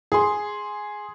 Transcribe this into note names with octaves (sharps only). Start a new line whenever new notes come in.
G#4 C6